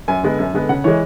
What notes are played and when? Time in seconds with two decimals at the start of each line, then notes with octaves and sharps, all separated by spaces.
0.08 F#2 G#5
0.23 D3 G#3 B3
0.39 F#2
0.53 D3 G#3 B3
0.69 C#3 F#5
0.84 E3 G#3 C#5